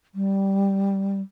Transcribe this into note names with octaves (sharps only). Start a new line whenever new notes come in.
G3